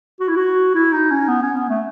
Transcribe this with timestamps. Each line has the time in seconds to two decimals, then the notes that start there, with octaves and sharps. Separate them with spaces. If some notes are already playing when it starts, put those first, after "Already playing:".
0.20 F#4
0.28 E4
0.36 F#4
0.74 E4
0.92 D#4
1.11 C#4
1.28 B3
1.42 C#4
1.56 B3
1.69 A3